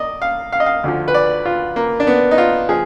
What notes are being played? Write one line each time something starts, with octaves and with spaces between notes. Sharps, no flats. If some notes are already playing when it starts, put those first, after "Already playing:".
Already playing: D5 D#5
F5
F5
D#5
F5
D2 D3 F3
B4
D5
F4
A#3
D4
B3
D#4
F4
F3 G#4